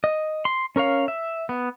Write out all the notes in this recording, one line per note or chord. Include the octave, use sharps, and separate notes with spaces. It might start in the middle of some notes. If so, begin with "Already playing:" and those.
D#5
C6
C#4 A#4 C#5 F5
E5
B3